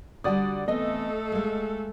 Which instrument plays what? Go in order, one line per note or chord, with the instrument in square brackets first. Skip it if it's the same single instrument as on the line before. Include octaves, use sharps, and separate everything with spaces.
[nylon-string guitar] D3 G3 [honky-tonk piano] F#4 D5 D#6
[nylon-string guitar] E3 B3 C4 [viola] A3 A4 [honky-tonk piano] D#5
[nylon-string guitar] G#3 A#3